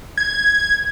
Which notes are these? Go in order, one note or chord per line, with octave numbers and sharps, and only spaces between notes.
G#6